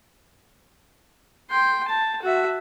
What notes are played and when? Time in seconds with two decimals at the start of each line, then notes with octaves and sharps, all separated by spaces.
1.50 G5 C6
1.88 A5
2.22 F#4 E5